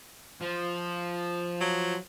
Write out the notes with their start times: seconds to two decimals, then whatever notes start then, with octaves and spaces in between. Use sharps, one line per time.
0.41 F3
1.61 F#3